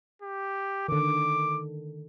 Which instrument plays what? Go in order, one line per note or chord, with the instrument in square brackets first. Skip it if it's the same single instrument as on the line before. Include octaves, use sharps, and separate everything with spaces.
[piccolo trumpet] G4
[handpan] D3 D#3 [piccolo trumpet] D6